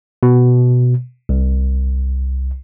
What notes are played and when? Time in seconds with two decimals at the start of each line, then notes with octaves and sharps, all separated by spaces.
0.23 B2
1.29 C2